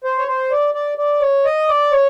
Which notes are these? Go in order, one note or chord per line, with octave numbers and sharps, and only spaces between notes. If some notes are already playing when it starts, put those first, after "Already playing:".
C5
C#5
C5
D5
D5
D5
C#5
D#5
D5
C#5